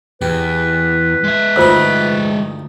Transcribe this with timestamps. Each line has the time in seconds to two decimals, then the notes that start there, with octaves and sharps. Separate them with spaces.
0.22 E2 G4 B4
1.24 G#3 E5
1.56 D2 G2 D#4 F4 C5 E6